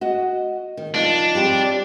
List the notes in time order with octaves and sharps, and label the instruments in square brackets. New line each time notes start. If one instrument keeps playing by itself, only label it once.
[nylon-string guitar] F#4 D#5
D#3
[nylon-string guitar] F3 D#4 [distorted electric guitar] D4
[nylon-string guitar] G3 C4 G4